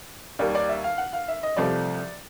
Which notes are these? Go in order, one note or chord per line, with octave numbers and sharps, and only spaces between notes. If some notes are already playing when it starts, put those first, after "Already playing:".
D#2 D#3 G3 A#3 D5
D5
E5
F5
F#5
F5
E5
D#5
C2 C3 F3 A3 D5